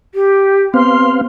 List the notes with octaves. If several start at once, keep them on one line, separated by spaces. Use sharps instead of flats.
G4
B3 C4 F5 C6